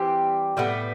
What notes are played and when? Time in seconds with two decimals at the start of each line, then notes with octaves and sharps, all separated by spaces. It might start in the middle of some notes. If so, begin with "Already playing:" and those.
Already playing: E3 G3 C4 G4
0.57 A2 G3 B3